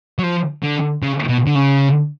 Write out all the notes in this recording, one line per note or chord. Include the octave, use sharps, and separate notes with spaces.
F#3
F3
D3
C#3
B2
D3
C#3